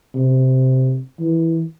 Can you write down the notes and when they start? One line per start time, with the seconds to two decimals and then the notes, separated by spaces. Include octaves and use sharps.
0.15 C3
1.20 E3